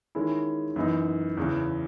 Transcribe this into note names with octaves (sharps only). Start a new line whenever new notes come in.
D#3 G#3 C#4 E4
F#2 E3 B3 D#4
E2 C#3 E3